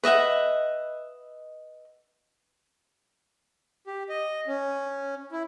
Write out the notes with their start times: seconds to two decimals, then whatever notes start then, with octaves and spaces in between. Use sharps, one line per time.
0.03 B4 D#5 E5 F#5
3.87 G4
4.09 D#5
4.47 C#4
5.32 E4